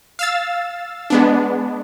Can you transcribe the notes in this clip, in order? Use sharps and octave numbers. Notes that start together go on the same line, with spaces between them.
F5 E6 A6
G#3 B3 D4